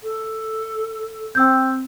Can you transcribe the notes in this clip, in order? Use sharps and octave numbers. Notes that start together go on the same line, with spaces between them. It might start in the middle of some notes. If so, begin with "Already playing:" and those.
A4
C4 G5 E6 G6